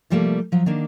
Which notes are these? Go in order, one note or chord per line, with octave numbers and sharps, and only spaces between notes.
C3 F3 G3 A3 A#3
F3 F#3
D#3 A#3 D4